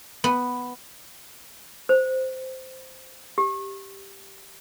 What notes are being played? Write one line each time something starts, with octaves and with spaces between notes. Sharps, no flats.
B3
C5
G4